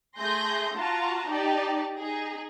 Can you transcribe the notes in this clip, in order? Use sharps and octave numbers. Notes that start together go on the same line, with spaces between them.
A3 G#4 C6 G6 A#6
F4 F#4 A5 A#5
D#4 G4 D5 A5
D#4 G#4